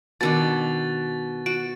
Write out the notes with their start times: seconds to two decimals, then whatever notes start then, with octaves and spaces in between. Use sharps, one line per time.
0.21 B2 D#3 D4 A6
1.46 F#4 D7